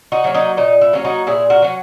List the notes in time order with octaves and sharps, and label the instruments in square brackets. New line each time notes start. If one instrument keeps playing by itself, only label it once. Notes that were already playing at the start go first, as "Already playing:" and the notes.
[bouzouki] D#4 F#4
F#3 A#3 C#4
D#4 F#4
A#2 D#4
E4
F#3 A#3 C#4
D#4 F#4
A#2 E4 G#4
F#4 A#4
F#3 C#4 F#4